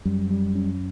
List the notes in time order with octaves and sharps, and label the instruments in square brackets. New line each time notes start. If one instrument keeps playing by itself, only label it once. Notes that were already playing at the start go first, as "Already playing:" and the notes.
[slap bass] F#2 [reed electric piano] G3
[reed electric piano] G3
C#4